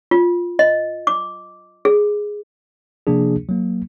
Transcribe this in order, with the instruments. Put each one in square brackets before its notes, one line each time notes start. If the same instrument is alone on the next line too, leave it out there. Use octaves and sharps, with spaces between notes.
[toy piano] F4
D#5
D6
G#4
[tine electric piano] C3 F3 A#3 D4 G#4
F#3 A#3